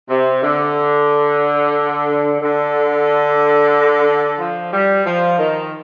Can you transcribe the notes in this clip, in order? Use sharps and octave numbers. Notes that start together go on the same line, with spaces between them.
C3
D3
D3
F3
G3
F3
D#3